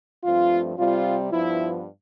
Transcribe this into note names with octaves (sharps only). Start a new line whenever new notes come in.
G2 F3 A3 C4 F4
C3 G3 C4 F4
G2 F3 B3 E4